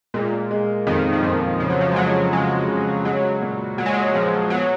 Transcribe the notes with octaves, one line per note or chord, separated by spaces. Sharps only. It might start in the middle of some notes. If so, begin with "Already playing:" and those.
A#2 G#3
G#3
F2 D#3
F3
F2 D#3
C#3 F3
F#3
F3
G#3
C#3 F#3
C#3 G#3
C#3
F#3 G#3
A#2
A#2 F#3
G#3
F#3
A#2 F3
F#3 B3